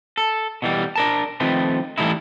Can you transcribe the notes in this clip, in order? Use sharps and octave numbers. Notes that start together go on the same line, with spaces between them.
A4
B2 E3 G3
D4 A#4 A5
D#3 F3 A3 C4 B4
E3 G3 A3 D#4 E4